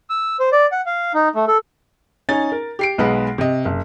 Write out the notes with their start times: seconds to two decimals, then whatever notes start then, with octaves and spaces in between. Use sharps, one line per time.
0.10 E6
0.39 C5
0.52 D5
0.72 F#5
0.86 F5
1.14 D#4
1.35 A3
1.48 A4
2.29 C#4 D#4 G#5 A6
2.52 A#4
2.79 G4 C7 D7
2.98 B1 G#3 B4 F#5
3.38 C3 D#5
3.65 F#1